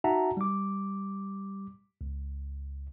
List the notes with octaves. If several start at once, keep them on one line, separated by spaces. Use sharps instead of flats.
D#4 F#4 E5 F#5 A5 A#5
G3 D6
C#2